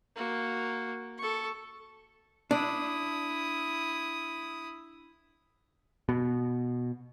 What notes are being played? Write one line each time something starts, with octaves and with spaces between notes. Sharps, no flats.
A#3 F#4
A4 C#6
D4 E4 D#6
B2